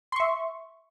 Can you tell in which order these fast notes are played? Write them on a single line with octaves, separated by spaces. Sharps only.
C6 C#6 E5